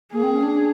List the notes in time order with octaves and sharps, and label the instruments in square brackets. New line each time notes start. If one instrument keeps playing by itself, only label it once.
[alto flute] A#3 [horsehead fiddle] G#4
[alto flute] C4
C#4
D4